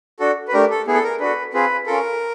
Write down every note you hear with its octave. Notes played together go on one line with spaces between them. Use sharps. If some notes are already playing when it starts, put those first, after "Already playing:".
D4 F#4 A4
B4
A3 D4 G4 A#4
A4
B3 E4 G#4
A4
A#4
D4 F#4 A4 B4
C4 F4 G#4 B4
C#4 F4 A4 A#4